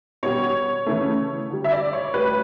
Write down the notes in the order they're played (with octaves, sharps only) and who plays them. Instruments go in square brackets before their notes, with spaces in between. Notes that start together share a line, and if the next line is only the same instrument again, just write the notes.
[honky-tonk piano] B2 G3 C#5
C#3 E3 A3
D3 G3
E5
D5
C#5
A2 G3 B4